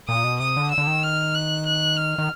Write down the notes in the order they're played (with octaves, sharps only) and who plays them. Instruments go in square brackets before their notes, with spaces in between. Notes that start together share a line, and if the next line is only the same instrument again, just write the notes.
[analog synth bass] A#2 [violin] D#6
[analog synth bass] B2
[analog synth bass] C3 [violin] D#6
[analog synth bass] D3
[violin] E6
[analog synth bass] D3
D#3
[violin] F6
F#6
F#6
F6
[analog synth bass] D#3